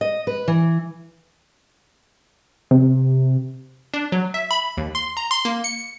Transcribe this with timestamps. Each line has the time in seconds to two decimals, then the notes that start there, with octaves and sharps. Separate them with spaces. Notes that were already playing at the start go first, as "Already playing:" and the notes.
0.01 D#5
0.27 B4
0.48 E3
2.71 C3
3.94 D4
4.12 F#3
4.34 E5
4.51 B5
4.77 D#2
4.95 C6
5.17 A#5
5.31 C6
5.45 A#3
5.64 C#7